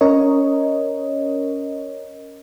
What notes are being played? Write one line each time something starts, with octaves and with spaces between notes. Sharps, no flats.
C#4 A#4 C#5 D#5